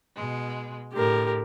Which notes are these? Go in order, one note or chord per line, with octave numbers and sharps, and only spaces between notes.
B2 G#3
A2 D3 G4 A#4